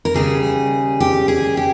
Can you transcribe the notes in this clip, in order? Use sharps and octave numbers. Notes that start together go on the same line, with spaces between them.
A#4
D#2 C#3 G3 G#4
G4
G#4
G4